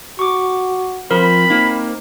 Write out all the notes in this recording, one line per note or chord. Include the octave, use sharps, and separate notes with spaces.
F#4 C#6 D6
F3 C4 A#4 B5
A#3 D#4